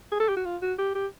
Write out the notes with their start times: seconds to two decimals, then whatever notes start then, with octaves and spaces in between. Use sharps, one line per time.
0.12 G#4
0.20 A4
0.29 G4
0.37 F#4
0.45 F4
0.62 F#4
0.78 G4
0.95 G4